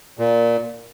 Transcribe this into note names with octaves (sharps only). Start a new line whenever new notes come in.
A#2